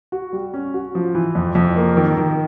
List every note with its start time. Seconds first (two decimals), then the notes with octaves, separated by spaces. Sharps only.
0.12 F#4
0.33 G3
0.54 C#4
0.74 F#4
0.95 F3
1.15 E3
1.35 F2
1.55 F2
1.76 A#3
1.97 D#3
2.17 D#3